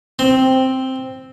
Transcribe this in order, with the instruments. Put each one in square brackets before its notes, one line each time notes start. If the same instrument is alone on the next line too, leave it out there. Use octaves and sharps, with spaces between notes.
[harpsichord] C4